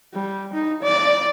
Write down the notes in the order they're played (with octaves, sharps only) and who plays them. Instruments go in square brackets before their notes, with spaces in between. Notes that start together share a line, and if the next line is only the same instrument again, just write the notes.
[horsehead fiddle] G3
D#4
D5